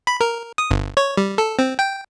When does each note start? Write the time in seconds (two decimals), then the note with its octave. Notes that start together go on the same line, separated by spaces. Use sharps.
0.07 B5
0.21 A#4
0.58 D#6
0.71 G1
0.97 C#5
1.17 G3
1.38 A4
1.59 C4
1.79 G5